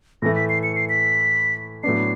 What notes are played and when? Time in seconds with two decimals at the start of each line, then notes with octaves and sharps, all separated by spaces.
0.22 A2 E3 A3 A#6
0.36 B6
0.49 C7
0.63 C#7
0.76 C7
0.89 B6
1.83 A2 F#3 B3 D4 C7